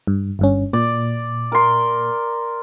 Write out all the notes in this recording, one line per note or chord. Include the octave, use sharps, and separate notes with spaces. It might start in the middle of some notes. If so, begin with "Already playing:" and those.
G2
G1 G2 C#4
A#2 D5
A#4 C6